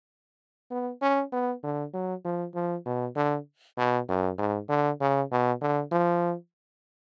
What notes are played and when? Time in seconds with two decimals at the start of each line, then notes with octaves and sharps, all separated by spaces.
0.71 B3
1.02 C#4
1.33 B3
1.63 D3
1.93 F#3
2.25 F3
2.55 F3
2.86 B2
3.16 D3
3.78 B2
4.09 F#2
4.39 G#2
4.69 D3
5.01 C#3
5.31 B2
5.61 D3
5.92 F3